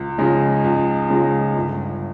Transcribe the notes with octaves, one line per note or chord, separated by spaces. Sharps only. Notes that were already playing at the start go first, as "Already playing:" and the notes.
Already playing: C#2
C#3 F3 G#3 D#4
C#2
C#3 F3 G#3 D#4
G1